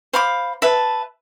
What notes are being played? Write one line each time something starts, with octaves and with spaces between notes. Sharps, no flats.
C5 F5 B5 D6
B4 E5 A5